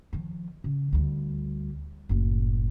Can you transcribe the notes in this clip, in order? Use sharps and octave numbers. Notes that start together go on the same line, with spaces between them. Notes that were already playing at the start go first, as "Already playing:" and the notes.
D#3 F3
C#3
D2 G3
F#1 A2